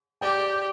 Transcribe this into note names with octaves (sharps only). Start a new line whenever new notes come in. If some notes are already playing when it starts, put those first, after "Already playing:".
G4 D5 G5